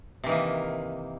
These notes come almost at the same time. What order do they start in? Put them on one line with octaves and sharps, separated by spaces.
C3 E3 D#3 A#3